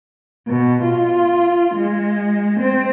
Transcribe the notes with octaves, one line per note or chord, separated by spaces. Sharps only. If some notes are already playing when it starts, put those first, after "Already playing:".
B2
F4
G#3
C4